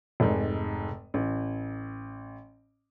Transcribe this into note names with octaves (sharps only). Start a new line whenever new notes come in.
F1 G#2
A1